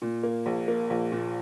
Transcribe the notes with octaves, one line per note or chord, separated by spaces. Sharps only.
A#2
A#3
A#1
A#3
A#1
A#2